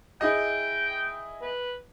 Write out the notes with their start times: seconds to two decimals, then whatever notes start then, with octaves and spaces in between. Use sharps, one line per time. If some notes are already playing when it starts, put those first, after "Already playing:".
0.21 E4 G#4 D#5 G5
1.41 B4